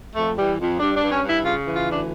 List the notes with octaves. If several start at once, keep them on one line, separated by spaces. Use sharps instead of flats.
F2 A3
E3 G3
F2
G2 D4
D4
G2
C#4
G2
E4
C#3 F4
E3
F4
D2 D4